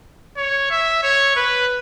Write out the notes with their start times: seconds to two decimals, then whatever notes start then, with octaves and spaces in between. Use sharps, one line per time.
0.37 C#5
0.71 E5
1.03 C#5
1.36 B4